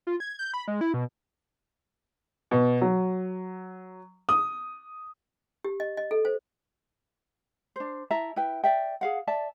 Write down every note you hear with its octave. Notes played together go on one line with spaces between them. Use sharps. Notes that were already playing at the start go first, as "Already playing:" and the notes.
F4
G#6
G6
B5
G#3
E4
B2
B2
F#3
D#6
G4
D#5
D#5
A4
C5
D4 C5
E4 E5 A5 A#5
E4 B4 G5
D5 E5 G5
G#4 F5 F#5
D5 E5 A5